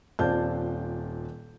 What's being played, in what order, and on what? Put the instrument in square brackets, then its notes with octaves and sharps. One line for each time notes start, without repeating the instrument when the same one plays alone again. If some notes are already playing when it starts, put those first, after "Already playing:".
[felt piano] D#1 C4 F4 D5 A5 G6